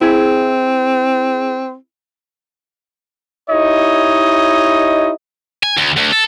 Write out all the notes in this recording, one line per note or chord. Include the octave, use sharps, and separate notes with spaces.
C4 E4 G#4
D#4 E4 G4 C#5 D#5
G#5
D2
D2
A4